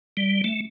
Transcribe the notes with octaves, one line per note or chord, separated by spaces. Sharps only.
G3
A3